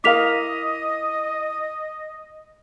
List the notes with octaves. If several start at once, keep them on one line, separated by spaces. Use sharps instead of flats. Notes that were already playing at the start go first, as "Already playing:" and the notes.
E4 A#4 D#5 F5 D6 B6 F7